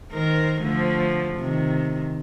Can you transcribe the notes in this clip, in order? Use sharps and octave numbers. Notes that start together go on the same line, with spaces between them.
D#3 A#4 C5
D3 F3 A3
C3 D#3